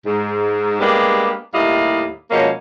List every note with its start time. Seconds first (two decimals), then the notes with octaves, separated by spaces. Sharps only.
0.06 G#2
0.80 G3 G#3 A#3 B3 D4 G4
1.54 D#2 A2 G3 E4 D#5 F5
2.31 B2 F3 G#3 A#3 C#4